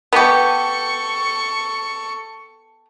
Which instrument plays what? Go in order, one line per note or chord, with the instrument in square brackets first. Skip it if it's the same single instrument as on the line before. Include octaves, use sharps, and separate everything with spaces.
[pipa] B3 G4 [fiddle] A4 C#6